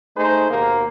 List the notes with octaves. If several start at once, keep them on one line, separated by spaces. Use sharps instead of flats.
A3 D#4 G#4 C5
D#2 B2 A#3